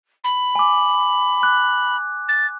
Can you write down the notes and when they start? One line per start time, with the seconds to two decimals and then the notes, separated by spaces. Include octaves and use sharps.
0.24 B5
0.55 G#5 D6
1.42 D6 F#6
2.28 A6